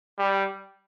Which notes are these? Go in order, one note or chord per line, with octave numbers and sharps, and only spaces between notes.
G3